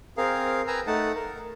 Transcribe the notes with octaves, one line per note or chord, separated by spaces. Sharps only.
C4 G#4 A#4 F5
B4 G5 G#5 A#5 E6
A3 D#4 F#5 A5
A#4